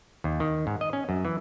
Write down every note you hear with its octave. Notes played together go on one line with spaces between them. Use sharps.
D#2
D#3
G#2
D#5
C#4
F#2
E3